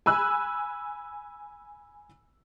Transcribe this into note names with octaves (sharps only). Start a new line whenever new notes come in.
G#5 B5 E6 F#6